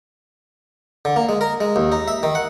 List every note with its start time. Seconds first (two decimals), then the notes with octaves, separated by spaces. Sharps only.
1.05 D3
1.16 A#3
1.29 G#3
1.41 A#4
1.61 G#3
1.76 D#2
1.92 D#4
2.08 E5
2.23 D#3
2.35 F#5